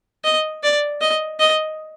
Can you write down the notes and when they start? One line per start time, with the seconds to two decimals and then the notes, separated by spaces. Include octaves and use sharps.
0.24 D#5
0.63 D5
1.01 D#5
1.40 D#5